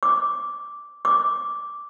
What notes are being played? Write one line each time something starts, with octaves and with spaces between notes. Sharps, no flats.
D6
D6